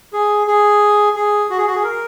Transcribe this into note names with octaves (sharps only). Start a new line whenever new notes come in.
G#4
G#4
G#4
F#4
G#4
F#4
G#4
A#4